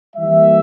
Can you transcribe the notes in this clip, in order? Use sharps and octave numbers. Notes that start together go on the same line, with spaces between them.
E3 G3 A#3 E5